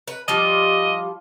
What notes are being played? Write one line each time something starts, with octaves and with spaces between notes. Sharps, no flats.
B4
F3 G3 F4 D#5